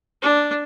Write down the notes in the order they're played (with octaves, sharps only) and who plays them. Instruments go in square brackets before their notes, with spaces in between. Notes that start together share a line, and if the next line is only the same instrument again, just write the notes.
[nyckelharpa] D4